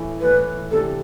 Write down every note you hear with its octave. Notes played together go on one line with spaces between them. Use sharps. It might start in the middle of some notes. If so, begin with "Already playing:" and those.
Already playing: A2 E3 A3
A2 E3 A3 B4
C3 E3 A3 D4 G4 A4